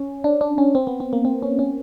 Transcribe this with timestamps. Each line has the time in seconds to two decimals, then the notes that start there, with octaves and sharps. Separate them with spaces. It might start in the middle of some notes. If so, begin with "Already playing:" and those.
Already playing: C#4
0.24 D4
0.41 D4
0.58 C#4
0.75 C4
0.87 B3
1.00 C4
1.13 A#3
1.25 C4
1.42 C#4
1.59 C#4